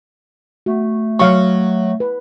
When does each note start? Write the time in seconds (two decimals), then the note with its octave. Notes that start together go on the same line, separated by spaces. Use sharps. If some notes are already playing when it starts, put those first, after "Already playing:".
0.66 A3 F#4
1.19 F#3 F5 C#6
2.00 B4